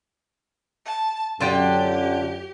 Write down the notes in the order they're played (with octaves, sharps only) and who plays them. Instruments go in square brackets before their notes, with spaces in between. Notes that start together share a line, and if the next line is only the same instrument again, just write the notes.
[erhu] A5
[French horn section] F#2 [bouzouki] D3 F4 G5 [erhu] G4